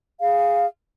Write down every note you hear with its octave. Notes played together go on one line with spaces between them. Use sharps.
G#4 F5